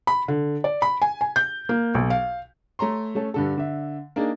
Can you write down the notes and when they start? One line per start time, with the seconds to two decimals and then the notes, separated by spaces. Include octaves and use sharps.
0.07 B5
0.28 D3
0.64 D5
0.82 B5
1.02 G#5
1.21 G#5
1.36 G6
1.69 A#3
1.95 B1
2.10 F5
2.79 A3 C#5 A#5 C6
3.15 A3 C#4 A4
3.34 G2 D3 A4
3.57 D3 E5
4.16 A#3 D4 D#4 G#4